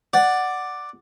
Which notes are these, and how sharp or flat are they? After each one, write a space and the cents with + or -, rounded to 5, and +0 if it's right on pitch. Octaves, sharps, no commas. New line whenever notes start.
D5 +5 F#5 +0